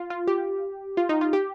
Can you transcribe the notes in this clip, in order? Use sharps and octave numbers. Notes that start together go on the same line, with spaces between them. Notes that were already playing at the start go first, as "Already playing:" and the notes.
Already playing: F4
F4
G4
F4
D#4
F4
G4